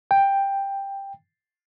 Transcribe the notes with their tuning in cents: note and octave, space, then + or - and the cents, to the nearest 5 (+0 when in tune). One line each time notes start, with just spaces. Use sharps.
G5 +10